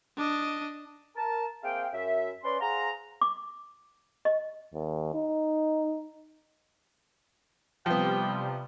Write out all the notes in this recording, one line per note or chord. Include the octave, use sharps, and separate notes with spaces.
D4 D#5
A#4 A5
A#3 C4 G#4 E5 F5 G5
F#2 E5
C#4 B4 D5 C6
G#4 C5 F5 F#5 A#5
D6
D#5
D#2
D#4
C3 F3 G3 B3 G5